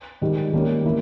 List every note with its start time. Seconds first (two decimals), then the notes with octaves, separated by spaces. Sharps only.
0.21 G#2 D#3 G3
0.53 D#3 G3 A#3 C#4
0.86 E3 A#3 E4